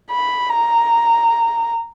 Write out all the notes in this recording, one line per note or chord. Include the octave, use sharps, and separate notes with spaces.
B5
A#5